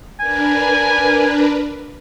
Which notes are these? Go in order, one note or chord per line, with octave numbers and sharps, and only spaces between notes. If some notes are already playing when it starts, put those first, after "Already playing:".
D4 A#4 B4 G#5